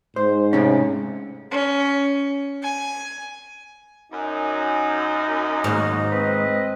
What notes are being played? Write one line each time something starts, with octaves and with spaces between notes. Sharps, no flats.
G#2 C5
A2 C3 C#4
C#4
G#5
F#2 D#4
D#2 G#2 F#3 A#3 F#4
C4 B4 D#5